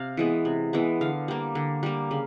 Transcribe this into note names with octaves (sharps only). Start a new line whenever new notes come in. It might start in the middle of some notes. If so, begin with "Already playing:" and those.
Already playing: C3 F5
E3 G#3 B3
C3
E3 G#3 B3
D3 F5
G3 A#3
D3
G3 A#3
C#3